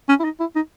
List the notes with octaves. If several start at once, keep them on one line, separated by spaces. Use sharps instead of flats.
C#4
E4
D#4
E4
D#4